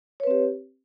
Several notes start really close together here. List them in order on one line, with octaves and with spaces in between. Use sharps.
C#5 B4 C4 G4